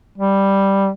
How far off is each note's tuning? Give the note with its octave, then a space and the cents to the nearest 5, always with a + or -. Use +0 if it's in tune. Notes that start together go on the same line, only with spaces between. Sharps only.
G3 +0